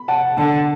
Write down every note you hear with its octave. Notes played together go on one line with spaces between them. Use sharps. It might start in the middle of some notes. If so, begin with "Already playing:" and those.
Already playing: B5
F#5 A5
D3 F#5 A5